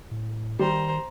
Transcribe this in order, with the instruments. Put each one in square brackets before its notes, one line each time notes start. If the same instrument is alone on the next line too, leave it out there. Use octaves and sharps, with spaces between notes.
[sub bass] A2
[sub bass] D#3 [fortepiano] G3 [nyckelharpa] C5 A#5